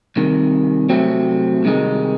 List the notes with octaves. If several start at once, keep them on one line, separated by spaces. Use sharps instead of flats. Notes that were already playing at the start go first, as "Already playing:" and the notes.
C2 C3 D#3
C3 F#3 A3 C4
C2 C3 D#3 G#3 D#4